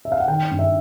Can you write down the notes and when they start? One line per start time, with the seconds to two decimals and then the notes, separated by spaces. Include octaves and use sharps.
0.05 E5
0.12 F5
0.20 F#5
0.28 D#3 G5
0.51 G2
0.59 E5